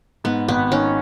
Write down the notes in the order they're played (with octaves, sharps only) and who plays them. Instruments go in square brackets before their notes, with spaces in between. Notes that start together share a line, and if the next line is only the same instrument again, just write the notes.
[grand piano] G#2 [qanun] B3
[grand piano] G#1 [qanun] B3
[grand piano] D#3 [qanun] C#4